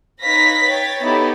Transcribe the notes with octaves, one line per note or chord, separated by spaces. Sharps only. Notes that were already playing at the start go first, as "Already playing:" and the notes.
D#4 B4 C#5 F5 A#6 B6
C#5 G5 A6
B3 D#4 E4 G4 A4